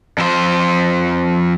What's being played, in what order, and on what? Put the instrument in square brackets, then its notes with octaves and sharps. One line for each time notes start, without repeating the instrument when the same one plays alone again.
[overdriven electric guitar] F2 C5